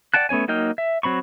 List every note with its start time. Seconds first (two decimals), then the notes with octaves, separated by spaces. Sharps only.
0.14 D5 F#5 G5 A5 F#6
0.29 A3 B3 C#4 C#5 G#5
0.48 F#3 A#3 D#4 G5 F6
0.78 E5
1.03 F#3 C4 B5 C#6